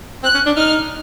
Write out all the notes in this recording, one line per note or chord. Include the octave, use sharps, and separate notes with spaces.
C4 F#6
C#4
D4
D#4 F6